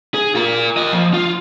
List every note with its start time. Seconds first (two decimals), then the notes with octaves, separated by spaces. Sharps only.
0.14 G#4
0.35 F4 A#4
0.77 A#3 D#5
0.92 F3
1.14 F4